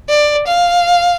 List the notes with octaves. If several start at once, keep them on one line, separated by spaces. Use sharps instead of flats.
D5
F5